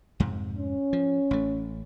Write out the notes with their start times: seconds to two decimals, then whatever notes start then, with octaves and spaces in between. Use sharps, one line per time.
0.20 F2 G#2 C3
0.58 C#4
0.93 F3
1.31 A1 A3